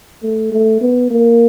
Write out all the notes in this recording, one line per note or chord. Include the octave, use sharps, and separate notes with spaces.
A3
A3
B3
A#3